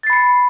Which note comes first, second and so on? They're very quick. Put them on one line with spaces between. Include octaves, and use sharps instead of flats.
A6 C7 B5 C#7